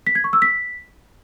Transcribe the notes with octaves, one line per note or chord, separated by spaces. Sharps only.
B6
G#6
C#6
E6
B6